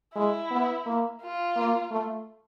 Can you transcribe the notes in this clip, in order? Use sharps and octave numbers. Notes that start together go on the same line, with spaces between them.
G#3 E4
B3
A#3
F4
A#3
A3